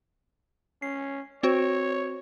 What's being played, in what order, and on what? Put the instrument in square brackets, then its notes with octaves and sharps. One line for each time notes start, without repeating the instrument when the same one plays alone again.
[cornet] C#4 [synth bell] C7
[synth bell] C4 F#4 C5 [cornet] C#5